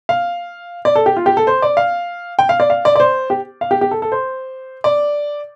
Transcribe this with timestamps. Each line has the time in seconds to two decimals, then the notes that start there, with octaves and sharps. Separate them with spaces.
0.09 F5
0.85 D5
0.96 A4
1.06 G4
1.17 F4
1.26 G4
1.37 A4
1.47 C5
1.62 D5
1.77 F5
2.39 G5
2.49 F5
2.60 D5
2.70 F5
2.85 D5
2.96 D5
3.00 C5
3.30 G4
3.61 F5
3.71 G4
3.81 G4
3.91 A4
4.02 A4
4.12 C5
4.84 D5